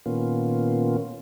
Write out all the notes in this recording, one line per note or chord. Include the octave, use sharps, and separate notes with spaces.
A#2 D#3 A#3 B3 C#4 F4